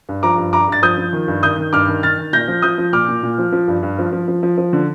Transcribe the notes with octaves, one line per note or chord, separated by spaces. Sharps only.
G2
F3 A#5 D6
G2
G2 A#5 D6
G2 A6
F3 D#6 G6
F3
D#3
G2
D#3 D#6 G6
D#3
G2 D6 F6
D#3
D#3 F6 A6
D#3
A#2 G6 A#6
F3
F3 D#6 G6
F3
A#2 D6 F6
A#2
A#2
F3
F3
G2
G2
F3
F3
F3
F3
F3
D3